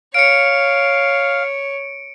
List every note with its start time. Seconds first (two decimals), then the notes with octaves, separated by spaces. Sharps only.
0.14 C#5 F5 C#7 D7